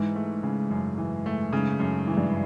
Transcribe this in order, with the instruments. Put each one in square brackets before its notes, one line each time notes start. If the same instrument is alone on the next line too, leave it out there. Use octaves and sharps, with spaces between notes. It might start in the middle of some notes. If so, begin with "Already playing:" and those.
Already playing: [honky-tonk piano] G#2 [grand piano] E3
[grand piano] A3
C#3
F#2
E3
A3
[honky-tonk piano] G#2 [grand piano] C#3
[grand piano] F#2
E3
[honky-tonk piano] G2